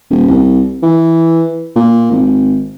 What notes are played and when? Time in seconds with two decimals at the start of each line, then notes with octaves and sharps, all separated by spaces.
0.10 D#1
0.28 C2
0.83 E3
1.76 A#2
2.12 G#1